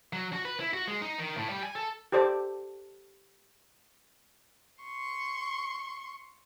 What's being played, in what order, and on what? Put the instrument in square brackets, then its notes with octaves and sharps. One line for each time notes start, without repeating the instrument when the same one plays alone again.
[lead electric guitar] F#3
F#4
B4
E4
F#4
G#3
D#4
D#3
A2
G3
G#5
A4
[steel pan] G4 A4 C5 D5 D6
[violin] C6 C#6